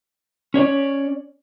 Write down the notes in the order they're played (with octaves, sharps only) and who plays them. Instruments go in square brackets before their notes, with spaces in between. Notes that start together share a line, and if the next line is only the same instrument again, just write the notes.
[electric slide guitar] C#4 C#5 D5